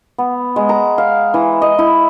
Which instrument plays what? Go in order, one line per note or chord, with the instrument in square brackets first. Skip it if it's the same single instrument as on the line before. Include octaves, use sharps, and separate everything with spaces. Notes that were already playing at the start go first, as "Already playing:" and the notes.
[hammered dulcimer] B3
G#3
A#5
F5
E3
D#5
E4